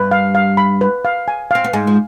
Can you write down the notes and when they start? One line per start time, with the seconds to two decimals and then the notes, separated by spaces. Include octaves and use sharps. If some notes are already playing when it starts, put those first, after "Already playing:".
Already playing: G2 G3 B4
0.11 F5
0.35 F5
0.57 B5
0.81 B4
1.05 F5
1.28 G#5
1.51 C4 F5
1.64 B3
1.73 G#2 G#3 G#5
1.87 F3